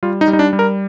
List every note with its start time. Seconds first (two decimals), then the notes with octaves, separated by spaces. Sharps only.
0.03 G3 F4
0.21 D#4
0.28 G3
0.33 D#4
0.39 D4
0.53 G3
0.59 A#4